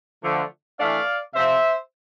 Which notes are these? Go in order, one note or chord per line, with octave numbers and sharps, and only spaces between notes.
D3 F3 A3
E3 A3 D4 D5 F5
C3 F3 C4 C5 E5